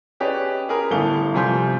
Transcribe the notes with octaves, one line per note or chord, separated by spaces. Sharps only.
C#4 G4 G#4 B4 D5 D#5
G4 G#4 A#4 B5
G1 A2 G3 A4 F5 G7
C3 F3 G3 G#5 C6 G6